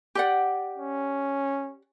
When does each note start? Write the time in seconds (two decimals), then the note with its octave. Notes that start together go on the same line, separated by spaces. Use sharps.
0.15 G4 D5 F#5
0.78 C#4